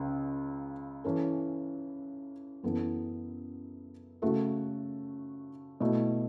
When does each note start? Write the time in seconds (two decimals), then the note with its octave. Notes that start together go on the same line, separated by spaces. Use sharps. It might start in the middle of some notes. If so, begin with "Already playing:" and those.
Already playing: C#2 C#3
1.04 E3 C#4 A4
2.63 F#2 E3 B3 E4 A4
4.22 C#3 A3 F#4 A4 E5
5.80 B2 A3 E4